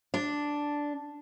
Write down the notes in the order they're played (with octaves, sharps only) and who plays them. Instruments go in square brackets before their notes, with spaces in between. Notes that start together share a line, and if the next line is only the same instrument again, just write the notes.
[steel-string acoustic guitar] D4